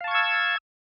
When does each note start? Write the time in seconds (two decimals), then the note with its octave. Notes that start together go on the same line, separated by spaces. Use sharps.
0.01 F5
0.04 A5
0.08 C#6
0.11 G#6
0.15 E6